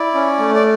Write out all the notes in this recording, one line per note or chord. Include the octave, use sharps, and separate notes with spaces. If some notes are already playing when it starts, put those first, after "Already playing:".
Already playing: E4 D5
C#4
A3
D5